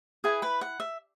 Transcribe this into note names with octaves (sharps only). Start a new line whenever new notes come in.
E4 G#4 B4 G#5
B4 B5
F#5
E5